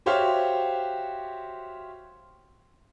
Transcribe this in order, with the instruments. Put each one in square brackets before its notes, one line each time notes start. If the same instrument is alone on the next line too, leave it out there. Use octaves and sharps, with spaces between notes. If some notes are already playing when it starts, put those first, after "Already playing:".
[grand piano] F#4 G4 C5 C#5 E5 F5